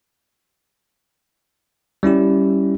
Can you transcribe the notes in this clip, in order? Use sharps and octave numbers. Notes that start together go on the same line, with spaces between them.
G3 C#4 E4 G4